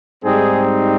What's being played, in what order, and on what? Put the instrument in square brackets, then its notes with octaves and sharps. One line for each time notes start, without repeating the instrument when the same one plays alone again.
[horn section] G#2 G3 C4 D#4 G#4